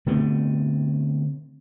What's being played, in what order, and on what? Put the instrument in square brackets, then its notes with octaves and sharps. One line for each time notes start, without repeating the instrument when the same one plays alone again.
[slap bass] D3 A3 B3 C4